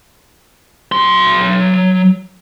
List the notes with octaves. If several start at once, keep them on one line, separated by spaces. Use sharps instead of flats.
F#3 C6